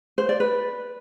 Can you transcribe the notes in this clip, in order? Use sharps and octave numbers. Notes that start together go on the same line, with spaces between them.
C5
D5
B4